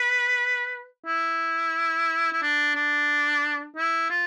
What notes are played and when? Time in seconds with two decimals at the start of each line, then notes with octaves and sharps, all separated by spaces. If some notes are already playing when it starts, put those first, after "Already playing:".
Already playing: B4
1.07 E4
2.33 E4
2.42 D4
2.75 D4
3.76 E4
4.10 F4